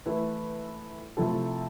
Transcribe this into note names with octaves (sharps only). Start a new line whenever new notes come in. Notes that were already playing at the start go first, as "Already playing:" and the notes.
E3 A3 E4 B4
C3 F3 A3 E4 A4